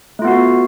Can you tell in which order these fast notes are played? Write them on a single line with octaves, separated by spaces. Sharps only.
A3 F4 B3 F#4